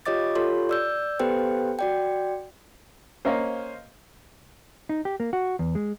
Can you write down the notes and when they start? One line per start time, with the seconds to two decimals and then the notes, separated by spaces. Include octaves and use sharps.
0.06 F4 G4 C#5 D#5 D6 A6
0.35 F4 G4 A4 C#5 C6
0.69 D5 E6 G6
1.20 B3 G4 A4 B4 C5 G5
1.79 F#4 D5 G5
3.25 A#3 C#4 C5 D#5 F5
4.89 D#4
5.05 G4
5.20 A#3
5.33 F#4
5.59 E2
5.75 G#3